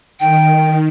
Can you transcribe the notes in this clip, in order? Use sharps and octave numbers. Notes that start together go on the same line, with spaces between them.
D#3 G5